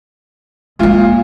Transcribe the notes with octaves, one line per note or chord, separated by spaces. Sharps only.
A#2 G#3 A#3 F4